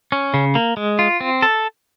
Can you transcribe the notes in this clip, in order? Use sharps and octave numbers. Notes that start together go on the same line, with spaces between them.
C#4
C#3
A#3
G#3
F4
C4
A4